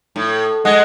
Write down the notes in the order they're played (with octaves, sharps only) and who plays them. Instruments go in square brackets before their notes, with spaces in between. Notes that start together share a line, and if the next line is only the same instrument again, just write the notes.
[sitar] A2
[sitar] G#3 [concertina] D#5 F#5